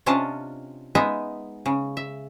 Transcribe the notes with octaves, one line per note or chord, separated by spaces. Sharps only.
C3 C#4 D4 F4 D#5 A5
G#3 B3 D#4 D#5 E5
C#3
E5